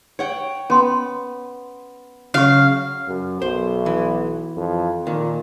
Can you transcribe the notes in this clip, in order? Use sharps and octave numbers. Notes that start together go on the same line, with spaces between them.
C#5 F#5 G5
B3 C#4 C6
C#3 F#3 C#5 F5 C#6
F#2
B1 C5
E3
F2
A#2 D#3